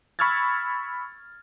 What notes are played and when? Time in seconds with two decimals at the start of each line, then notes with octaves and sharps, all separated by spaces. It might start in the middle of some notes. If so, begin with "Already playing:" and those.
0.19 B5 C#6 E6 F6 G#6 A6